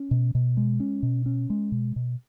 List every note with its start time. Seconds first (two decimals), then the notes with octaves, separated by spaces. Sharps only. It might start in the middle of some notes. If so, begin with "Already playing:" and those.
Already playing: C#4
0.11 B2
0.35 B2
0.57 G#3
0.80 C#4
1.03 B2
1.26 C#4
1.50 G#3
1.72 B2
1.96 B2